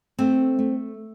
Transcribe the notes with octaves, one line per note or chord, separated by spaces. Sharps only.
A3 C4
A3